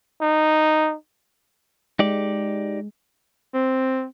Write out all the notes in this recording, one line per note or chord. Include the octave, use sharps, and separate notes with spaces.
D#4
G#3 D#4 G4 D5
C4